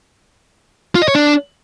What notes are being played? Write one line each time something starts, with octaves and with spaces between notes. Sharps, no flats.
F4
D#5
C#5
D4